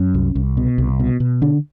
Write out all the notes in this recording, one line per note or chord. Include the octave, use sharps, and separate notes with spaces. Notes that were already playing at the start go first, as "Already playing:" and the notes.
Already playing: F#2 C#4
C2
C2
B2
C2
B2
B2
D3 D4